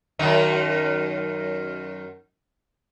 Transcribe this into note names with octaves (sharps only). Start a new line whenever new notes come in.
F#2 D#3 D#4